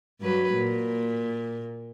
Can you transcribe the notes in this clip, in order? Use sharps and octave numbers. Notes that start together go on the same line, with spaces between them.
G2 F#3 B4
A#2